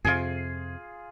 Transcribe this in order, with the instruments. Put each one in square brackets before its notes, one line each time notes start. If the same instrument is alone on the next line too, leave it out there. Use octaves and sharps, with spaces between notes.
[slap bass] F2 C3 [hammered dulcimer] F4 G#4